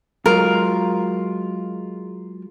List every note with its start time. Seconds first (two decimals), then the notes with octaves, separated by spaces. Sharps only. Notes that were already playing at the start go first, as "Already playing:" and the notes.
0.26 F#3 G#3 F4 A#4